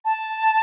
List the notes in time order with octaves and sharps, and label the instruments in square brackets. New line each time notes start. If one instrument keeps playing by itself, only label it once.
[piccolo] A5